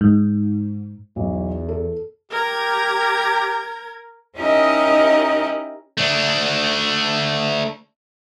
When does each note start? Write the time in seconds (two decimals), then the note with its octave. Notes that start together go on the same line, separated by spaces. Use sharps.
0.01 G#2
1.16 B1 E2
1.69 A4
2.32 G4 A#4 A#5 G#6
4.38 C#4 D#4 E4 G4 A#4 D#5
5.97 A3 D4